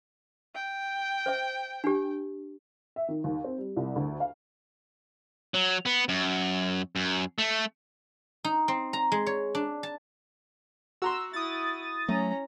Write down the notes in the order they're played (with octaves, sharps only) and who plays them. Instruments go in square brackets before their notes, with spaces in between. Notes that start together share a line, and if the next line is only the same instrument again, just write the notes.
[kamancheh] G5
[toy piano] C5 E5
D4 G4
[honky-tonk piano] E5
D#3
D#2
C4
G3
C2
D2
F5
[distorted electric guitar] F#3
B3
F#2
F#2
A3
[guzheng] D#4
C4
A#5
G#3
C#5
D4
A5
[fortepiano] F#4 A#5 C6 [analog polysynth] E6
[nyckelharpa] E4 [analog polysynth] D#6 A6
[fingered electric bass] F#3 A3 [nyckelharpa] C#4 A#5